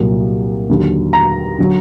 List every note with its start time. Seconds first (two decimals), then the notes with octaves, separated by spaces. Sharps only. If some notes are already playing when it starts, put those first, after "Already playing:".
Already playing: C2 A#2 F#3 A#3
0.69 D#2 D3 F#3
1.13 A#5
1.58 D3 F#3